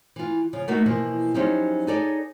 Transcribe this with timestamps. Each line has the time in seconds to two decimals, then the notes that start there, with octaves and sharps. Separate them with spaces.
0.16 E3 F4
0.53 C#3 F3
0.68 A3 A#3 D#4 F#4 B4 D#5
0.86 B2 E3 F3 A#3
1.34 F3 F#3 C#4 D#4 E4 G4
1.87 D#4 G#4 A4 C#5 D5